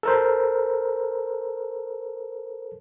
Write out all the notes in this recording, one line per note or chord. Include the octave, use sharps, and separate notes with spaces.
A4 A#4 C5